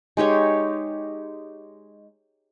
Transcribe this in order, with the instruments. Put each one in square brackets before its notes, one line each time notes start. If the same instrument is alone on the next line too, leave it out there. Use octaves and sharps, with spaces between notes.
[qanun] G#3 D#4 G4 C#5